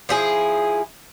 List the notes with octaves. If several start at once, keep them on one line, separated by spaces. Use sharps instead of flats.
F3 E4 G#4